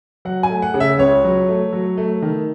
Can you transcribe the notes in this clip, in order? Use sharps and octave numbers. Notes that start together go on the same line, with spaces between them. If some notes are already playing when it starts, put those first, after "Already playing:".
F#3 F#5
G#5
A3
F#5
C#3
E5
C#2 C#5
F#3
A3
F#3
A3
D#3